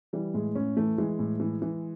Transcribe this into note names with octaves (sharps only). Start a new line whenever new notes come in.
E3 G3
A2 G#3
A2 C#4
E3 A3
E3 G#3
A2
E3
E3